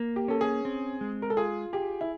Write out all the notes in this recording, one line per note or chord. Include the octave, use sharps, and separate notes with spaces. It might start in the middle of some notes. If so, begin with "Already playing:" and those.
Already playing: A#3
G4
C#4 A4
G#4
C4
G#3
A#4
A4
F4 G#4
G4 G#4
E4